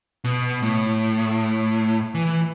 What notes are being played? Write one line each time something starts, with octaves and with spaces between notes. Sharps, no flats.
B2
A2
E3